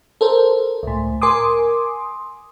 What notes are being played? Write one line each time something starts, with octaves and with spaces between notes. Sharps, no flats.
A4 A#4 C5
C#2 A2
A#4 G#5 C6 D6 D#6